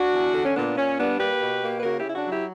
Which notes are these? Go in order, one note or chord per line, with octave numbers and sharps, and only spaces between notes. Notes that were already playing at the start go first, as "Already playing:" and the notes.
Already playing: D4 F#4
E2
D3
C#4
A#2 B3 D4
A#2 C#4
G3 B3 D4
A#3 G4 B4
B2
A#3
B4
C#3 F#4 A#4
E4 G4
C#3
E4
D4 F#4
F#3 E4 G4